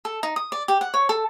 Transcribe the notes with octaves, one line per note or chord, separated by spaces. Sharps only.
A4
D#4
D#6
D5
G4
F#5
C#5
A4